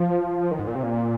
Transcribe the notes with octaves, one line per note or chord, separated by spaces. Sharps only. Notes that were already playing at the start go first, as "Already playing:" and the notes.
Already playing: F3
D#3
G#2
A#2
C3
A#2